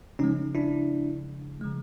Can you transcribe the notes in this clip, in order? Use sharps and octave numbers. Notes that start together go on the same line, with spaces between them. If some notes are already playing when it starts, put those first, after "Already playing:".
C#3 F3 G#3 C#4 D#4
D4 E4
C#3 F3 G#3